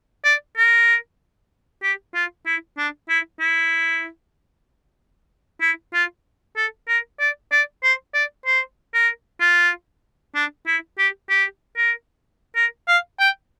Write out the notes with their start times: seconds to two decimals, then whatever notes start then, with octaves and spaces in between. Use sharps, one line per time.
0.25 D5
0.57 A#4
1.83 G4
2.14 F4
2.46 E4
2.78 D4
3.09 E4
3.40 E4
5.61 E4
5.94 F4
6.56 A4
6.88 A#4
7.20 D5
7.52 D5
7.83 C5
8.14 D5
8.46 C5
8.94 A#4
9.41 F4
10.35 D4
10.67 E4
10.98 G4
11.30 G4
11.77 A#4
12.56 A#4
12.88 F5
13.20 G5